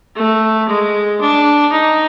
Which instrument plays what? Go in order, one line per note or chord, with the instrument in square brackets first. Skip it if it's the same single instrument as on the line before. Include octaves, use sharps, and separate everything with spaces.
[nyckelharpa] A3
G#3
D4
D#4